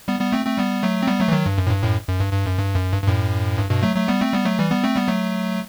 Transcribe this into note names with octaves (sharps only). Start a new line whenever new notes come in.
G3 B3
G3 B3
A3 C4
A3 C4
G3 B3
F#3 A3
C4
G3 B3
F#3 A3
E3
D#3 F#3
G2
F#2
A2
G2
F#2 A2
F#2
G2
G2
F#2
G2
F#2
G2
G2
F#2 A2
G2
G2 B2
F#3 A3
F#3 A3
G3 B3
A3 C4
G3 B3
F#3 A3
E3 G3
G3 B3
A3 C4
G3 B3
F#3 A3